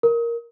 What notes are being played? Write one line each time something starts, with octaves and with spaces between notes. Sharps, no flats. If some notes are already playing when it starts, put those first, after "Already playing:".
A#4